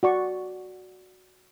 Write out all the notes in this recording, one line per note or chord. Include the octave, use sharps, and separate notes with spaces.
F#4 D5 C#6